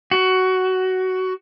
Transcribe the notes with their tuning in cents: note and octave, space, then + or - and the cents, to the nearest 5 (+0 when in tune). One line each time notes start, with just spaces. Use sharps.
F#4 +15